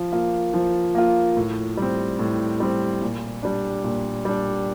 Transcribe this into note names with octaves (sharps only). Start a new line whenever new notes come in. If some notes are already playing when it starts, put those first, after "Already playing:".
Already playing: F3
A#3 F4
F3
A#3 F4
A2
G3 C4
A2
G3 C4
A#2
G3 D4
A#2
G3 D4